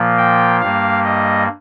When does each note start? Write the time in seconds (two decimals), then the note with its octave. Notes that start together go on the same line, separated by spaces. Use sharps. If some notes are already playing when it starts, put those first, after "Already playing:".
Already playing: A#2 F3 A#3
0.18 G5
0.61 G2 G3 A#3 F5
1.04 D#5